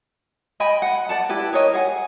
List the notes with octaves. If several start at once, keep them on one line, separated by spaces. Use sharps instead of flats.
D#5 G5 G#5 B5
F#5
D5 F#5 A5
E4 G4 B4
G#4 A#4 C#5 D#5
G#4 F#5 G#5